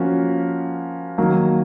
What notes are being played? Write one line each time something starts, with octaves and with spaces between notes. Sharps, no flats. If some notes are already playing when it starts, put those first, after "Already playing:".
Already playing: F3 A#3 C#4 F#4
D#3 F#3 A#3